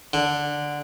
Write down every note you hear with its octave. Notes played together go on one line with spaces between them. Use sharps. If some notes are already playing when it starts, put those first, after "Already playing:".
D3